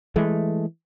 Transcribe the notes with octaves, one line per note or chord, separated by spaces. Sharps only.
E3 G#3 A3